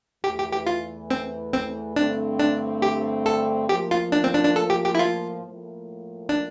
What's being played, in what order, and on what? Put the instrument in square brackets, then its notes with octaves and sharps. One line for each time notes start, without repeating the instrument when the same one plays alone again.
[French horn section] E2 E3 A3 [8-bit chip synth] G4
[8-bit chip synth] G4
G4
F4
C4
C4
[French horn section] G2 D3 A3 C4 [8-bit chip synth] D4
[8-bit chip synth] D4
G4
A4
[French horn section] A2 F3 A#3 [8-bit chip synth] G4
[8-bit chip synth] F4
D4
C4
D4
D4
A4
G4
G4
E4
F4
[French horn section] A2 F3 A#3
[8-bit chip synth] D4